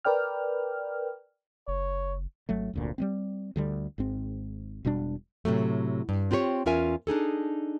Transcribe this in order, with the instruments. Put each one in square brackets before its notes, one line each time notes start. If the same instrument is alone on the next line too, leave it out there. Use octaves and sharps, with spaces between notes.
[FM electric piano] A#4 B4 D5 G5 F6
[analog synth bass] F#1 [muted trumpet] C#5
[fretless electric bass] G#1 F#3 A3
F1 D2 A#2
G3 G#3 C4
D2 D3 G3
G#1 G#2 C4
E1 B2 G3 D4
[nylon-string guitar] A2 C3 F#3 A3
G2
C4 F4 G4 B4 C#5
E2 C#4 F4 A#4 E5 G#5
D4 D#4 G#4 A4